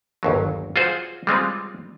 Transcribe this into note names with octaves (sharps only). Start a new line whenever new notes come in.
G1 D#2 F#3
F4 F#4 G#4 C5
G3 G#3 C4 F4